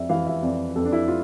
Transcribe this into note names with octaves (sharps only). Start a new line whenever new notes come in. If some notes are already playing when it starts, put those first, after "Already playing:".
Already playing: F2 D5 E5
E3 F5
E5
F2 D5
F2 A4
D4
E4
F4